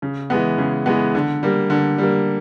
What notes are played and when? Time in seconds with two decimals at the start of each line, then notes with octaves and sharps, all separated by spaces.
0.02 C#3
0.30 E3 G#3 B3
0.58 C#3
0.86 E3 G#3 B3
1.15 D3
1.43 G3 A#3
1.70 D3
1.98 G3 A#3